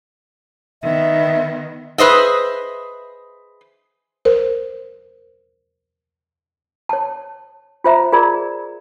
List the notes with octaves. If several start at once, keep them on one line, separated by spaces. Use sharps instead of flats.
D#3 B3 E5
G#4 B4 C5 D#5 E5
A#4 C5
C#5 A5
F4 C5 E5 A#5
F4 G#4 A#4 D5 A#5